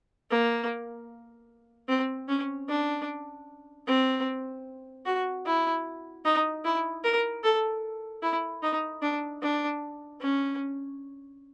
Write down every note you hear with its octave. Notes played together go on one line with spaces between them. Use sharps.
A#3
C4
C#4
D4
C4
F#4
E4
D#4
E4
A#4
A4
E4
D#4
D4
D4
C#4